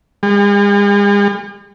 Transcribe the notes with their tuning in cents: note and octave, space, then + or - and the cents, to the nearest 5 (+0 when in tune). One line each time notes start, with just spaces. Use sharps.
G#3 -45